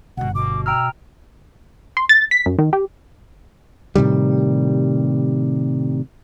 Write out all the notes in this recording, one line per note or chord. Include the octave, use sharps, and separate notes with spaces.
G1 B2 B3 F#5
B2 D6
G5 A#5 E6 F6
C6
A6
B6
F#2
D#3
G4
A2 C3 D#3 G3